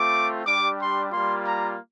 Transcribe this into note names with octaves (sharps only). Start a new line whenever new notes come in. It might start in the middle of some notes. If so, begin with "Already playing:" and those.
Already playing: A3 C4 F4 D6
G3 D4 G4 D6
C6
G3 A#3 F4 C6
A#5